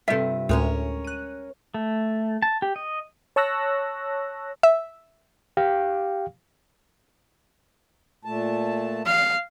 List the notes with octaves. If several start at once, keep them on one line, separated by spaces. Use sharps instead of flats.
G2 C3 F4 G4 A4 E5
D2 A2 G#3 C#4 A#4 C#5
F#6 D#7
A3
A5
G4
D#5
C#5 A5 C#6 E6 F#6 A#6
E5
G4 F5 G5
A#2 A3 A5
F5